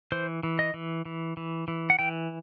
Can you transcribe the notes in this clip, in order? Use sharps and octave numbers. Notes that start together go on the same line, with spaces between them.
E3 C5
E3
D#5
E3
E3
E3
E3
F#5
E3 G5